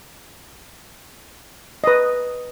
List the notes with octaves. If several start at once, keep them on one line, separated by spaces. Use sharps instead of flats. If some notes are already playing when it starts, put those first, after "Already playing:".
B4 D#5